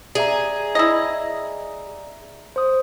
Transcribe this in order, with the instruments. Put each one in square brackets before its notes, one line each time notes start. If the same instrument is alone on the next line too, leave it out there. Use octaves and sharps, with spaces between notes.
[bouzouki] G#4 [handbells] D5 E5 A#5
[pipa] E4 D#5
[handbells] C5 D#6